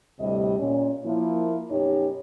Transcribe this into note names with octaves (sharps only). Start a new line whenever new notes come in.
D2 A2 C3 G3 D#5
A#2 C#4
F3 A#3 E4
F#2 B2 D#4 G4 C#5